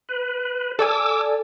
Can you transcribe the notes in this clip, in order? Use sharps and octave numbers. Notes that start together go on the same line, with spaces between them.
B4
A4 D5 G#5 D6 E6